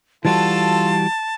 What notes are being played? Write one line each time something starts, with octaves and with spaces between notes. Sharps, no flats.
E3 G3 F4 F#4 A4 A5